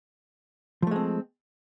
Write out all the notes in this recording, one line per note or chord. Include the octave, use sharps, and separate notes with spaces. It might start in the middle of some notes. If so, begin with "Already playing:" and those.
F3 G#3 A3 C4